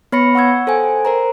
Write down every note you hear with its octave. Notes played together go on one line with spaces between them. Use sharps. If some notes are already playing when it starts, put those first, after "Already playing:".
B3 C#5 B5 A#6 C#7
F#5 C#6 E6 G#6
A4 C5 G5 G#5
A#4 C5 A#5